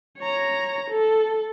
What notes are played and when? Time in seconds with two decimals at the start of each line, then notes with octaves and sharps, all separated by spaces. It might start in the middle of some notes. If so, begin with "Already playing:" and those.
0.18 C#5 A#5
0.90 A4